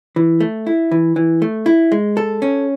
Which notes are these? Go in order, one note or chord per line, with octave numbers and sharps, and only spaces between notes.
E3
A3
E4
E3
E3
A3
E4
G#3
A4
C#4